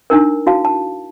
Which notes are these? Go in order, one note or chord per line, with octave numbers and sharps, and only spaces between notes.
D4 D#4 A#4
E4 F#4 F5 A5
A5